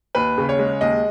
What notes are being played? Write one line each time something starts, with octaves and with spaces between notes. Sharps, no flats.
D#2 B4
C#3
C#5
G#3
D#2 D#5